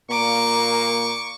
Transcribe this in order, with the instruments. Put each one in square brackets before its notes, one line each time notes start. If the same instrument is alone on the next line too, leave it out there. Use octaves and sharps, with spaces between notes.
[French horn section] A#2 A#3 [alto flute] A#5 [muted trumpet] C#6 [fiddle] D6